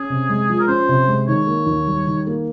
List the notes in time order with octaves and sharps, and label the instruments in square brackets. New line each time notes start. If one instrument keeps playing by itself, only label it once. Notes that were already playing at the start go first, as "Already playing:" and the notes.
Already playing: [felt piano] C#4 [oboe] G#4
[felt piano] C3
G#3
F3
[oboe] A#4
[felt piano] C#4 [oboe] C5
[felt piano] C3
G#3
[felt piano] D#3 [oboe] C#5
[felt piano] A#3
D#2
G3
D#3
A#3